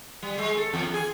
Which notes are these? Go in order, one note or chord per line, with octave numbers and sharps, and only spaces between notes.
G3
G#3
A4
E2
G#4